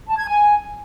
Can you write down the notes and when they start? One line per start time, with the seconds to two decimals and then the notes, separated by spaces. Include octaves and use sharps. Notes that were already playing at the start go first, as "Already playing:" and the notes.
0.08 A5
0.18 G#6
0.28 G#5